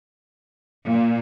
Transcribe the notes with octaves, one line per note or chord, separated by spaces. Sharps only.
A#2